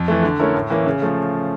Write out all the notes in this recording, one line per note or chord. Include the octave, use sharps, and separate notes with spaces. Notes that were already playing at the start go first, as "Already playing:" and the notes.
Already playing: F2
E3 A3
D3
A3 C#4 E4 A#4
A2
E3 A#3 C#4
C#3
F3 A3